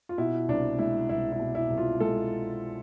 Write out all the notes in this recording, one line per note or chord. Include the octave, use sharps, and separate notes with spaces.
F4
B2 E4
C2 D4
G#3 E4
C2 E4
E4
B2
E4
C2
F4
G#3 A4